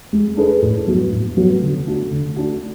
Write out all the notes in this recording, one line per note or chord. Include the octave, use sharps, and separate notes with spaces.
G#3
D4 G#4 B4
A2
F#3 B3 F#4
A2
F#3 B3 F#4
D3
A3 D4 F#4
D3
A3 D4 F#4